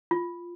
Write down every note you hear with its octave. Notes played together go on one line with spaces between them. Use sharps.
F4